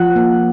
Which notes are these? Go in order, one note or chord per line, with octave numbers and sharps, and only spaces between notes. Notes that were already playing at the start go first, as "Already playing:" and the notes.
Already playing: F3 F#5
A#3